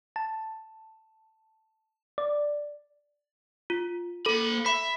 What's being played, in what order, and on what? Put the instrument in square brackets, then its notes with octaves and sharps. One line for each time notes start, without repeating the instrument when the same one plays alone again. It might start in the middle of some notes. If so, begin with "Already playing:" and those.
[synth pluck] A5
D5
[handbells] F4
[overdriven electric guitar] A#3 B5 [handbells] A4
[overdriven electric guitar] E5 [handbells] B5